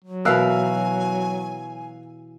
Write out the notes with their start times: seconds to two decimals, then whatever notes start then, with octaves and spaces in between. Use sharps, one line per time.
0.05 F#3
0.25 B2 E3 A#4 F5 G#5 E6 F#6